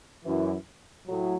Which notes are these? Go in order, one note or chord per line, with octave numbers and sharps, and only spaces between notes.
F#2 E3
A2 F#3